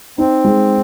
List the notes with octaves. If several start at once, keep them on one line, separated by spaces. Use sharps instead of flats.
C4 D#4
G#3